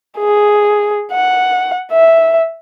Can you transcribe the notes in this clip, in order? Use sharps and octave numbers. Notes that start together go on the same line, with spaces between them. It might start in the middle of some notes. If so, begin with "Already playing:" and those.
G#4
F#5
E5